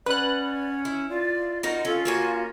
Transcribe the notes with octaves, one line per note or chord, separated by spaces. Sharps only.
C#4 B4 D5 F#5 F#6
E4
F4 D5
D#4 F#4 A#4
C#4 F4 A4
A#3 C#4 F#4 G#5